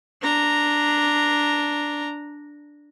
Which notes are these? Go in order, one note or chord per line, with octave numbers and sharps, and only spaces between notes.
D4 A#5